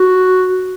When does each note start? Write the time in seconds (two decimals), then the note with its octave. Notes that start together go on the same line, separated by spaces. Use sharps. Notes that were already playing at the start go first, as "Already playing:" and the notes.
Already playing: F#4